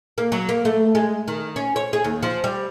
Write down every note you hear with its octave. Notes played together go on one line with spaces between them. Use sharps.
A#3
F#3
A#3
A3
G#3
D#3
C#4
C#5
G#4
D#2
F3
G3